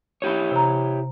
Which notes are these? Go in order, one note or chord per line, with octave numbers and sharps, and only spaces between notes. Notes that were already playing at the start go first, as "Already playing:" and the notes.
E4 G4 C#5
C3 A#5